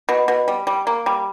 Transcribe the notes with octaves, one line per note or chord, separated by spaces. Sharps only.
B2
B2
G3
G3
A#3
G3